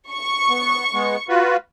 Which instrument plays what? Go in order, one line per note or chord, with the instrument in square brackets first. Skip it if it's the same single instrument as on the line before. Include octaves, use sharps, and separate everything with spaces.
[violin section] C#6
[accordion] B3
G#3 B3
F4 F#4 B4